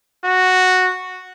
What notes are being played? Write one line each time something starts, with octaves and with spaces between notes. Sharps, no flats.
F#4